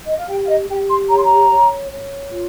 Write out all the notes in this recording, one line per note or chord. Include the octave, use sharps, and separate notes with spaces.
D#5
F5
G4 G5
F5
D#5
G4 G5
C6
C#5 A#5
C6
A#5
C#5
C#5
F4